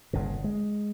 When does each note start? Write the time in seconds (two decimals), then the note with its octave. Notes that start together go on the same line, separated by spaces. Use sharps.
0.13 G1 A#2 C#3
0.44 G#3